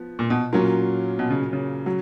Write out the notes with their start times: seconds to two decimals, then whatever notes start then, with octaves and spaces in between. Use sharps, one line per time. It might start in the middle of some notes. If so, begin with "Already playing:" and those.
Already playing: F3 B3
0.19 A#2
0.30 B2
0.53 A#2 F#3 C#4 F4 A#4
1.19 B2
1.30 C#3
1.53 C#3
1.86 F#3